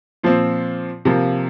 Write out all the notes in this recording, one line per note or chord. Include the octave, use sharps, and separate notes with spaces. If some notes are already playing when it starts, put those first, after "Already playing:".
A#2 F3 C4
C3 F3 A#3